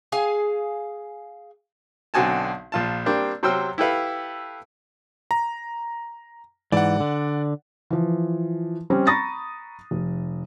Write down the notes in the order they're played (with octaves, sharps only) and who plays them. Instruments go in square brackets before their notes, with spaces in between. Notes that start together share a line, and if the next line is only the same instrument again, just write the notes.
[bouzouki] G#4 F5 G#5
[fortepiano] B1 D3 C4 F#4 G#5 A5
A#1 F4 A5
G3 A#3 C4 D4
C3 F#3 C5 G5 E6 F6
E4 G4 A4 B4 F5
[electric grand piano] A#5
[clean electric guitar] G#2 E3 [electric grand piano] D5 F#5
[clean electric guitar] D3
[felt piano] E3 F3
G3 C4 C#4
A#5 B5 C#6 D#6 A6 A#6
F1